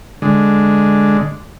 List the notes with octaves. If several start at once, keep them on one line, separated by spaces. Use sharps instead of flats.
D3 G#3